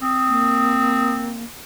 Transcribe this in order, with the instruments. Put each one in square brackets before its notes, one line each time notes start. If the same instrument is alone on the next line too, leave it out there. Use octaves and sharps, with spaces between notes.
[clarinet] C4 [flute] D#6
[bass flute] A#3